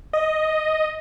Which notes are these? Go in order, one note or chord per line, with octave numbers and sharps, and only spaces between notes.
D#5